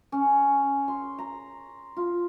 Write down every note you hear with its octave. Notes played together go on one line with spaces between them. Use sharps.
C#4
C6
A#5
F4